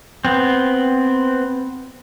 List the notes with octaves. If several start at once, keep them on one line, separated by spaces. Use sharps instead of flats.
B3 C4